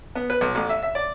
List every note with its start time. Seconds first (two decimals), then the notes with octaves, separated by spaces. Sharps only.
0.15 B3
0.30 B4
0.41 B1
0.55 A1
0.69 E5
0.83 E5
0.95 D5